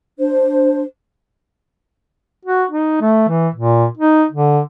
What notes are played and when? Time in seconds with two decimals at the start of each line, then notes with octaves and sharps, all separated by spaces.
0.18 D4 C5
2.45 F#4
2.71 D#4
3.01 A3
3.28 E3
3.54 A#2
3.97 D#4
4.31 D3